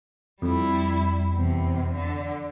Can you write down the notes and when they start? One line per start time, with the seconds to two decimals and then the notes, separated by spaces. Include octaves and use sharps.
0.42 F2 G3 E4
1.32 E2 C3
1.94 D3